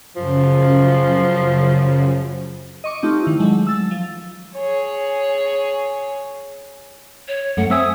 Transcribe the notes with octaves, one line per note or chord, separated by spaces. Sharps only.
F#2 C#3 F3
D#5 C#6 D6
A3 C4 D#4 F4 G4
D#3 E4
F#3 G#3 A3
E6 A6
F3
G#4 C#5
C#5
F#2 A3 F#5
C4 E5 G#5 D#6